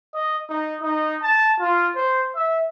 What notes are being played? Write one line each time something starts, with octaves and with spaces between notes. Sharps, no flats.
D#5
D#4
D#4
A5
F4
C5
E5